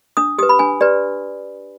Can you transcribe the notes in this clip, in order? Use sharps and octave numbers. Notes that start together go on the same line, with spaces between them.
D4 D#6
G4 B4 D#6
B5
D4 G#5
G4 B4 D5